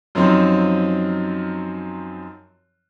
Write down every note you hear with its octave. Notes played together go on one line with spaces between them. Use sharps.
F#2 F3 F#3 C4 D#4